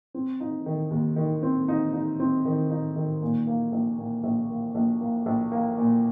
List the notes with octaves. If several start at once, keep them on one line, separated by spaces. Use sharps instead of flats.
C4
D#4
D#3
D#2
D#3
C4
D#4
D#4
C4
D#3
D#4
D#3
A#2
A#3
A#1
A#2
A#1
A#3
A#1
A#3
A#1
A#3
A#2